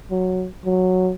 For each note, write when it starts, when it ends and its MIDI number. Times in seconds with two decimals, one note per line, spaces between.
0.11 0.47 54
0.65 1.12 54